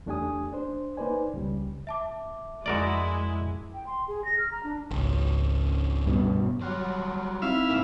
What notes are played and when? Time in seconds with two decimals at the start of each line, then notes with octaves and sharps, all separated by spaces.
0.06 E2 A3 D4 G4 G#5 D#6
0.53 D4 C5
0.97 A#3 D#4 B4 C5 D5 G#5
1.34 C#2 C#3 G3
1.87 E5 A5 D6
2.66 F2 G#3 E4 F#4 A#4 D5
3.74 G5
3.87 C6
4.08 G#4
4.25 A#6
4.39 F6
4.51 A#5
4.64 D4
4.91 G#1 C#2
6.06 G2 B2
6.61 F#3 G3 F#4 C6 F6 F#6
7.42 C4 D#4 E4 E5 F5
7.70 G#2 A#3